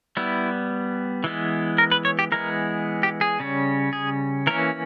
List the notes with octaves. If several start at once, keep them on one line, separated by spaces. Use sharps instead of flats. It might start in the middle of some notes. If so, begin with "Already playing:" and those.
G3 B3 E4
E3 G#3 B3
A#4
B4
C#5
G4
E3 G#3 B3 A#4
G4
G#4
C#3 G3 C#4
G#4
E3 A#3 C#4 A#4